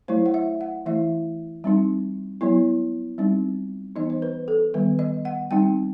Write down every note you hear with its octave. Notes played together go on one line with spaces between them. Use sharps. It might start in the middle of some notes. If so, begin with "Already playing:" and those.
F#3 A3 E4 C5
F#5
E5
F#5
E3 A3 E4 E5
G3 C4 D#4
F#3 B3 E4
G3 C4 D#4
E3 B3 D#4 D#5
C5
B4
A4
D#3 G3 B3 B4
D#5
F#5
G3 C4 D#4 G5